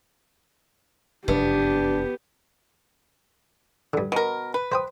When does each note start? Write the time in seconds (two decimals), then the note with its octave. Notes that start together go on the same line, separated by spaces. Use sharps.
1.28 F1 F#2 B3 D4 G4
3.94 G2 D3
4.12 B2 A#4
4.54 B4
4.72 C5 G5 D#6